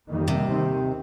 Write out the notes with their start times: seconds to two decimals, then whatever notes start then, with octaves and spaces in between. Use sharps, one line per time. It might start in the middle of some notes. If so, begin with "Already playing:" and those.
0.10 F2 D#3 G3 A#3
0.28 C3
0.46 D#2 D#3 C4